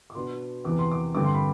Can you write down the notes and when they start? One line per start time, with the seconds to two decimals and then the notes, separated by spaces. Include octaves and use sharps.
0.10 D6
0.15 B2 B3 D4 C6
0.64 E2 C3 E3 B3 D6
0.79 C6
0.91 D6
1.15 G2 D3 A3 C4 D6
1.25 C6
1.34 B5